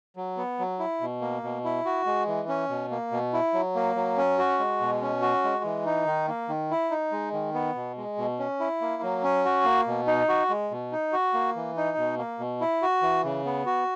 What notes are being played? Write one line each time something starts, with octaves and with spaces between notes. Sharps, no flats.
F#3
B3
F#3
E4
B2
A#3
B2
E4
F#4
G#3
E3
C#4
B2
A#3
B2
E4
F#3
A#3
F#3
C#4
F#4
G#3
B2
C#4
F#4
G#3
E3
D#4
D#3
A#3
D#3
E4
D#4
G#3
D#3
B3
B2
G#3
B2
C#4
E4
A#3
F#3
C#4
F#4
A#3
B2
D#4
F#4
G#3
B2
D#4
F#4
A#3
E3
D#4
B2
A#3
B2
E4
F#4
E3
C#3
B3
F#4